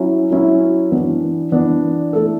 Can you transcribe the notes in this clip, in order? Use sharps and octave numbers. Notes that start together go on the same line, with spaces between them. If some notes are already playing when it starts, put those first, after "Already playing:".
Already playing: F#3 C#4 E4
F#3 C#4 E4
E3 B3 D4
E3 B3 D4
A3 E4 A4